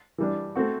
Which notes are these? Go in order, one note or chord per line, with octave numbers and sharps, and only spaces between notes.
E3 G3 D4
A3 C4 F#4